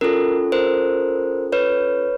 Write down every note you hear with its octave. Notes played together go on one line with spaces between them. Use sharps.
C#4 F4 A4 A#4
A#4 C5
B4 C#5